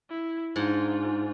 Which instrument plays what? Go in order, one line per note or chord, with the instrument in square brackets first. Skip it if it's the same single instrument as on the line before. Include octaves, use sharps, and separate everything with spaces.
[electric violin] E4
[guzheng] G#2 [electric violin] D4 F4